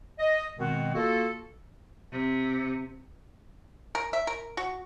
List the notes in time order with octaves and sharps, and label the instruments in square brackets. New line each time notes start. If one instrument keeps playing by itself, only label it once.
[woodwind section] D#5
B2 D#3 G#3 B3 C4 F#4
A#3 F4 F#4 A4
[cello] C3
[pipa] A#4
E5
A#4
F#4